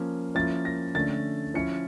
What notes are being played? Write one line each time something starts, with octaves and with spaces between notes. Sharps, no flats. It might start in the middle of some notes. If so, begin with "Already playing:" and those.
Already playing: F3 A#3 C#4
F3 A#3 C#4 E4 A6
A#6
D3 A3 C#4 A6
F3 C#4 E4 C#7